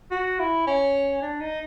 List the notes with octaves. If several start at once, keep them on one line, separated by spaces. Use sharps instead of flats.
F#4
E4
C#4
D4
D#4